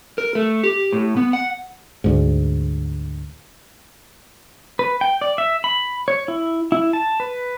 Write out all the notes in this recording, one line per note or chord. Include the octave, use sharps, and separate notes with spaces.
A#4
A3
G4
A2
B3
F#5
D2 G#2
B4
G5
D5
E5
B5
C#5
E4
E4
A5
B4